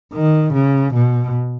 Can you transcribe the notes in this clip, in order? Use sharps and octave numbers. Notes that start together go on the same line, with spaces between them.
D#3
C#3
B2